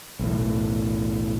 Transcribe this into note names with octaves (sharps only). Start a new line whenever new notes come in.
B1 E2 A2